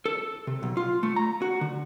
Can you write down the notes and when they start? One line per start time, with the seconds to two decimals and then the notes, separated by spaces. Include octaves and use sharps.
0.06 A4
0.47 C3
0.63 B1
0.77 F4
1.03 A3
1.16 A#5
1.42 F#4
1.61 D3